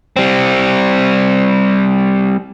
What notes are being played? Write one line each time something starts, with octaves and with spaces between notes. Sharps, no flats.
G3 C4